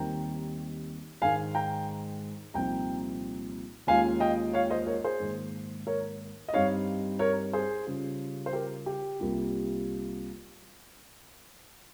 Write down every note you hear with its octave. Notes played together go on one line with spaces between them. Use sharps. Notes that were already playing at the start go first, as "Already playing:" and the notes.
Already playing: D#2 D#3 G3 C4 G5 A#5
G#2 D#3 G#3 F5 G#5
G5 A#5
C2 A#2 F3 C4 D#4 G5 A#5
D#2 D#3 G#3 C#4 F4 F5 G#5
D#5 G5
C#5 F5
C5 D#5
A#4 C#5
G#4 C5
G#2 D#3 A#3
A#4 C#5
D#5
G2 G3 C4 D#4 C#5 F5
A#4 C#5
G#4 C5
C#3 G3 C#4 F4
C5
G4 A#4
G4
C2 C3 G3 A#3 F4